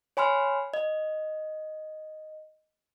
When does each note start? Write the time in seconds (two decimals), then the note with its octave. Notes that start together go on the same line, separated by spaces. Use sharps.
0.17 C#5 G#5 B5 C6 F6
0.74 D#5